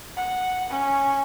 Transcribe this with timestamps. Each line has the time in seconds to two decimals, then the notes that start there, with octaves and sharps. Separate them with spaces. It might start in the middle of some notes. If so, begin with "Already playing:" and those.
0.16 F#5
0.70 C#4